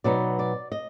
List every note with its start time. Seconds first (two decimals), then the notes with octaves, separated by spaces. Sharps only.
0.04 B2 F#3 B3 D#4 D5
0.39 D5
0.72 D#5